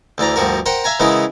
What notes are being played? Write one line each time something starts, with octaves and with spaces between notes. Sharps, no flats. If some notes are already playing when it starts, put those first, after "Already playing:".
D2 E3 D5 A#5
D2 G2 F3 F#4 A#4
A#4 C5 F#5 G5
E5 F5 G#5 A#5
C#3 E3 G#3 B3 E4 A#4